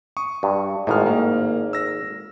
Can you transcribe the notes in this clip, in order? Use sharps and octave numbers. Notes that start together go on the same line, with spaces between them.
C#6 D#6
G2
G#1 F2 A2 D#4 F6
A#3
E6 A#6